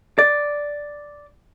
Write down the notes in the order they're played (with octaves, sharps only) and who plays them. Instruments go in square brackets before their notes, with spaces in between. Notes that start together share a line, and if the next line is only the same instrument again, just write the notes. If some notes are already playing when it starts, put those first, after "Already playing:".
[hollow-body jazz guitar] D5